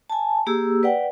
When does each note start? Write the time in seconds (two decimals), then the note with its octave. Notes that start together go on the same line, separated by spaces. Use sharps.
0.10 G#5 A5
0.46 A#3 G4 G#4 E6
0.83 B4 D5 F#5 G5